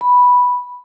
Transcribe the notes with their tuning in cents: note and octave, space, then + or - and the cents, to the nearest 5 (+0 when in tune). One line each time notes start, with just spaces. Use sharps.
B5 -5